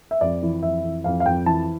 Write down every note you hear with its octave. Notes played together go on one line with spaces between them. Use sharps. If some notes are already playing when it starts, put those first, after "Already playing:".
E5
F2 D5
E3
F2 E5
E3
F2 F5
F5
F2 G5
E3 A5